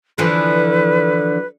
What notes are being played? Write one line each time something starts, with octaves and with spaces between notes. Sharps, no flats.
D3 E3 F3 B4